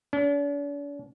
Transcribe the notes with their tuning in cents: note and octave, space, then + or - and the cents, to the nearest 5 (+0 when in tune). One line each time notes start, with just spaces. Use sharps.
D4 -45